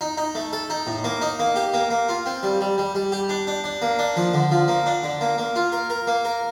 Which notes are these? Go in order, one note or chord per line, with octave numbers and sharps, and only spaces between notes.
D#4
D#4
A3
A4
D#4
A2
A#3
D#4
A#3
G4
A#3
A#3
F4
C4
G3
G3
G3
G3
G4
D4
D4
D4
A#3
D4
F3
D3
F3
A#3
D4
D3
A#3
A#3
F4
A#4
A#4
A#3
A#4